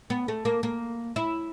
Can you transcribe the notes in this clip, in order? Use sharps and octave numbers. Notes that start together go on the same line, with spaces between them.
B3
A3
A#3
A#3
E4